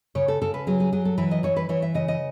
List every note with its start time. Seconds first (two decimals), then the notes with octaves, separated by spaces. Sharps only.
0.15 C#3 C#5
0.28 A4
0.42 C#3 A4
0.54 B4
0.67 F#3 G#4
0.80 G#4
0.92 F#3 G#4
1.05 A4
1.18 E3 B4
1.31 D#5
1.43 E3 C#5
1.56 B4
1.69 E3 C#5
1.82 E5
1.94 C#3 D#5
2.08 D#5